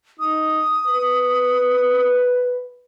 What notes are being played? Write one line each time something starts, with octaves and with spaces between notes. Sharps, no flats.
D#4 D#6
B4